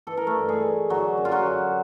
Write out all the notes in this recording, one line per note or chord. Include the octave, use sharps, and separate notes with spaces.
E3 A4
A#4
A3 A4
G2
G#3 G#4
G#3
D3 F#3 F#4
F#2
F4
F#3 F#4
F#3